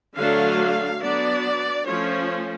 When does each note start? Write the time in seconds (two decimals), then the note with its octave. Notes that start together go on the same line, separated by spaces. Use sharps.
0.15 D3 F#3 A3 D4 F5
1.00 F#3 B3 D4 D5
1.86 F3 A3 C#4 C#5